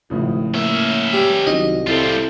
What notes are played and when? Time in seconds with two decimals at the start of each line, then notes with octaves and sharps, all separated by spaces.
0.10 G#1 A2 C#3 F3
0.54 A#3 C#4 E5
1.13 G3
1.47 C2 D#3 F#3 D#5
1.87 G3 C4 E4 F4 A4